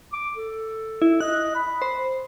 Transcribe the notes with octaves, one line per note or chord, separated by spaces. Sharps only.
D6
A4
E4
D#5 F#6
B5
C5